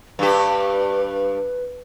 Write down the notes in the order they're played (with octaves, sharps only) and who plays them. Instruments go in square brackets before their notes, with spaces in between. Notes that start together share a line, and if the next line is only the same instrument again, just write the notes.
[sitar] G2 G4 [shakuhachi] B4